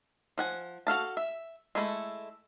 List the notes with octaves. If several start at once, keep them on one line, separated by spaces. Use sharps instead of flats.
F3 F#5 G#5
F#4 A4 F5 A5
E5
G#3 A3 E4 F#4 A4